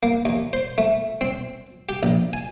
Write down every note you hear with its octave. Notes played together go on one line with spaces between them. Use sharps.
A#3
D#2
C5
A3
C4
G4
A#1
G#5